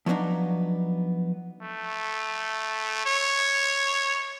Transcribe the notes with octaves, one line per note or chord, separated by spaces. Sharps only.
F3 F#3 B3 C4 D4 D#4
A3
C#5